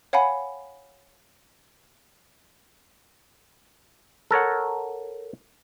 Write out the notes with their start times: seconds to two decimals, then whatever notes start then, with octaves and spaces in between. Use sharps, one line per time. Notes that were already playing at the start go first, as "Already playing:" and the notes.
0.13 C#5 F5 F#5 G#5 B5
4.31 A4 A#4 C#5 F#5